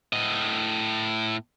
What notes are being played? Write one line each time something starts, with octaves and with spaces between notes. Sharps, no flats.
A2 D#5